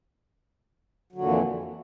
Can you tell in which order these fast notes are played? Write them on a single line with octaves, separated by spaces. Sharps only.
F#3 D3 A#2 F2 E3